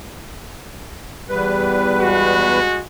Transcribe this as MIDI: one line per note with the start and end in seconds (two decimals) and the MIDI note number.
1.29 2.60 40
1.29 2.65 55
1.29 2.60 71
2.01 2.82 56
2.01 2.82 66